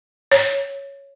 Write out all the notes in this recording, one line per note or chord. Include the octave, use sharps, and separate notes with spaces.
C#5